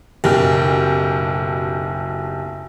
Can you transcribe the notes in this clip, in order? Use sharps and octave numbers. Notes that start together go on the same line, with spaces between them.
F#1 B1 G4